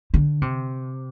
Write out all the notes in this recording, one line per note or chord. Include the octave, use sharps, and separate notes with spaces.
D3
C3